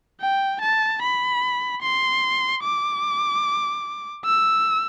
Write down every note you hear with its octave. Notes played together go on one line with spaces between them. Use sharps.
G5
A5
B5
C6
D6
E6